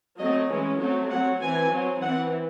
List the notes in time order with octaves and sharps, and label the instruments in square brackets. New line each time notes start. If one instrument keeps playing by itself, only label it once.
[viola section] F#3 A3 C4 D#5
E3 G#3 C#4
F#3 A3 C4
F#3 C4 F#5
E3 C4 G#5
F#3 C4
E3 C4 F#5